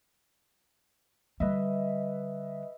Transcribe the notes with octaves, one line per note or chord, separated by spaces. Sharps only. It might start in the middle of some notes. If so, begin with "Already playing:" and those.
D3 G3 B4 D#5 E5